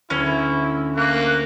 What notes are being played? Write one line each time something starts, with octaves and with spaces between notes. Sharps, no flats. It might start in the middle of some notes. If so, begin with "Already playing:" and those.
D2 C#4 E4
A#3 F#6